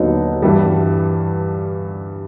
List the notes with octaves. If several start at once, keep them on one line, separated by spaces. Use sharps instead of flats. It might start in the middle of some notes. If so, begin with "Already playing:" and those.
Already playing: D#2 D3 F#3 B3 D#4
G2 E3 G3